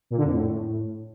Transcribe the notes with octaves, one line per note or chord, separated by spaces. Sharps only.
A#2
D3
F2
A2